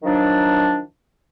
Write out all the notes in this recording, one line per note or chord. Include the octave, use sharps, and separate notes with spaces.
D#3 F3 F#3 D4